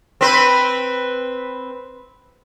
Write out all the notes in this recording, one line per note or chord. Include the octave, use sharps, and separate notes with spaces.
C4 B4